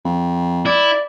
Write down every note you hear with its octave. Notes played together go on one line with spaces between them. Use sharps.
F2
E4 D5